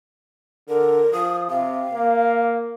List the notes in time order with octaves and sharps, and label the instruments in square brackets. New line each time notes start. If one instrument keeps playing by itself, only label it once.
[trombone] D3 [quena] A#4
[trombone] F3 [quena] D#6
[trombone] C3 [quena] F5
[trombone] A#3